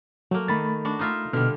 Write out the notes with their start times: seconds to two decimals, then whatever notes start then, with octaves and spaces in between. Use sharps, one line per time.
0.31 F#3 A3 A#3
0.48 D#3 A3 B5 A6
0.85 D4 F#4
0.99 D#4 F4 E5
1.33 B2 D3 G3 F6